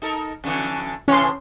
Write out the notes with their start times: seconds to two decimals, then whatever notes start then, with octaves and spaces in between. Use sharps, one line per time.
0.02 D#4 A4 A#4
0.44 F2 D3 E3
1.08 A2 C3 E3 C#4 C6